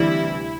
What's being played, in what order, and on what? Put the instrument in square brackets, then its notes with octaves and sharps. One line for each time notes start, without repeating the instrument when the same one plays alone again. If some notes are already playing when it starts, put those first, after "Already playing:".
Already playing: [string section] D2 C3 E3 G3 E4